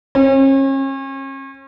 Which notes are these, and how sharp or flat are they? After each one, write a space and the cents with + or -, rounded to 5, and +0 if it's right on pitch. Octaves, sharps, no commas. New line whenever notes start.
C#4 -40